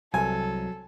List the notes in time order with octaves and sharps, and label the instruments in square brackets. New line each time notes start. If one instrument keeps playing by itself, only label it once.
[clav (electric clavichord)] C2 [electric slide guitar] F#3 [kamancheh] A4 [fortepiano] G#5